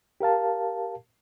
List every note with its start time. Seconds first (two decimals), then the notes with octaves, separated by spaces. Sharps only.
0.21 G4 A#4 F5 A5